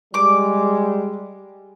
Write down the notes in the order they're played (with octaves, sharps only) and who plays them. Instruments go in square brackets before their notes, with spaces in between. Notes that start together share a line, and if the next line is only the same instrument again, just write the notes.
[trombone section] G3 G#3 [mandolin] D6